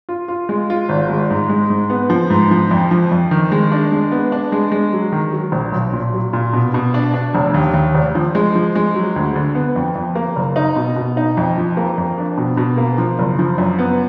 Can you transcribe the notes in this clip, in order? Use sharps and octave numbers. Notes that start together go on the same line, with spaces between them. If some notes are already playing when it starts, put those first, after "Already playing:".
F4
F4
G#3
F4
G#1
G#3
G#2
G#3
G#2
B3
F3
G#2
F3
F2
F3
F2
D#3
G#3
D4
G#3
B3
D4
G#3
G#3
F#3
D#3
F#3
A#1
B1
A#2
F#3
A#2
B2
B2
D4
D4
F1
D#2
D#2
F1
F3
G#3
F3
G#3
F#3
D2
D3
B3
F2
F2
A#3
F#1
D#4
B2
B2
D#4
F2
F3
A#3
F2
D4
B2
B2
A#3
F3
F#1
F3
F#2
B3